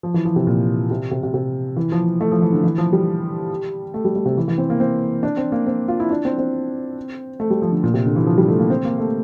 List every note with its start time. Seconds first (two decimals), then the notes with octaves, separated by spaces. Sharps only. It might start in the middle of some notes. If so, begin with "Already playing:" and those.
0.03 F3
0.14 E3
0.25 F3
0.36 C3
0.47 A#2
0.91 C3
1.11 C3
1.23 C3
1.34 C3
1.76 E3
1.92 F3
2.21 A3
2.32 F3
2.42 E3
2.53 D3
2.64 E3
2.78 F3
2.93 G3
3.94 A3
4.05 G3
4.15 G3
4.26 C3
4.37 E3
4.48 E3
4.58 C4
4.70 A#3
4.80 C4
5.23 D4
5.37 C4
5.52 A#3
5.66 C4
5.88 F4
6.00 E4
6.11 D4
6.25 C4
6.38 C4
7.40 A3
7.50 G3
7.62 F3
7.72 D3
7.84 A#2
7.94 C3
8.06 D3
8.16 E3
8.27 F3
8.38 G3
8.48 A3
8.59 A#3
8.70 C4
8.85 A#3
8.98 A3